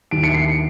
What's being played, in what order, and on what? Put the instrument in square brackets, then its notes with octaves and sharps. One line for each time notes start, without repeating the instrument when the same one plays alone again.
[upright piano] D#2 D7
C#7
C7